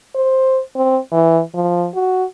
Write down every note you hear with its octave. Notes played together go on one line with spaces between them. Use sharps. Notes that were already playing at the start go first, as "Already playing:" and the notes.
C5
C4
E3
F3
F#4